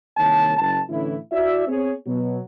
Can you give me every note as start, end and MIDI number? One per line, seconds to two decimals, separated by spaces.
0.17 0.55 36
0.17 0.55 51
0.17 0.55 58
0.17 0.55 73
0.17 0.55 81
0.59 0.79 30
0.59 0.79 81
0.89 1.16 45
0.89 1.16 50
0.89 1.16 52
0.89 1.16 61
0.89 1.16 64
1.32 1.66 64
1.32 1.66 66
1.32 1.66 74
1.32 1.66 76
1.67 1.91 59
1.67 1.91 60
1.67 1.91 68
1.67 1.91 73
2.05 2.39 47
2.05 2.39 54